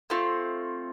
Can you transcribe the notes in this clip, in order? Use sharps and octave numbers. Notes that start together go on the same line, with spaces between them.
A3 C4 F4